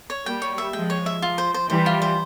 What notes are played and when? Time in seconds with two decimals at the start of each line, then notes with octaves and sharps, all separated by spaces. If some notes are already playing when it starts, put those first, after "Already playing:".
0.10 C#5
0.25 G3 A#3 G5
0.42 C#5
0.58 E5
0.73 F3 G#3 G5
0.90 C#5
1.06 E5
1.22 F3 F4
1.38 C5
1.54 C5
1.69 E3 G3 C5
1.86 F4
2.02 C5